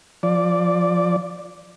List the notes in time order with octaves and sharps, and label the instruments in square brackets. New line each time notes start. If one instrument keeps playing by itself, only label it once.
[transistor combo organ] F3 D5